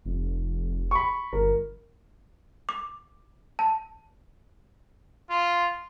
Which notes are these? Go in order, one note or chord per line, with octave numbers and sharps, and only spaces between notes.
F1
B5 C#6
G1 A#4
D6
A5
F4